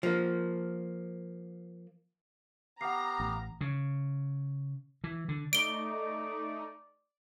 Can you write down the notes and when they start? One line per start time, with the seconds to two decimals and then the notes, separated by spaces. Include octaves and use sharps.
0.03 F3 A#3
2.81 B3 G4 F5 F#5 A#5 C7
3.20 A1
3.61 C#3
5.04 E3
5.28 D3
5.53 A3 D#4 D5 D7 G7